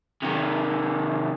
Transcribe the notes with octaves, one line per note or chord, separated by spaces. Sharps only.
C3 D#3